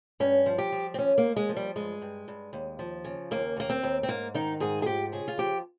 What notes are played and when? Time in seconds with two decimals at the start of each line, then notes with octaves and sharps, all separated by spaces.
0.20 G2 C#4
0.46 F3
0.58 G4
0.72 F3
0.94 C4
0.98 D#2 C#4
1.18 A#3
1.23 D#2
1.36 G#3
1.49 F3
1.56 G3
1.76 G2 G#3
2.02 G2
2.28 G2
2.53 D#2
2.79 F3
3.04 C#3
3.31 D#2 A#3
3.57 D#2 A#3
3.70 C4
3.83 D#2
4.03 C4
4.08 G#2 A#3
4.34 D#3 D#4
4.60 G#2 G#4
4.82 G#4
4.86 F3 G4
5.12 C#3 G#4
5.28 F4
5.38 F3 G4